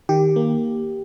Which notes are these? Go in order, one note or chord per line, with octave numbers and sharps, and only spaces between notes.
D#3 G4
A#3